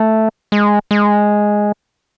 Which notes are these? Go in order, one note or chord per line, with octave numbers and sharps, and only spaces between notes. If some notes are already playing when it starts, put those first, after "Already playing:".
Already playing: A3
G#3
G#3